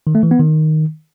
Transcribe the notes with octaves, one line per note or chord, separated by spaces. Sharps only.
D#3
A3
E3
B3
D#3